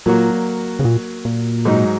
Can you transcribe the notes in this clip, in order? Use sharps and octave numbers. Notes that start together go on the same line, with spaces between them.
A#2 F#3 A#3 F#4
C#3
A#2
A#2
G#2 F#3 D#4